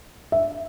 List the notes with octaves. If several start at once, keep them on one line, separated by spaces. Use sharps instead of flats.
E5